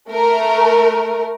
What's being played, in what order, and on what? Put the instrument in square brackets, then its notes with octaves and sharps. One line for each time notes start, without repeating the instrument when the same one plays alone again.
[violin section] A3 A#4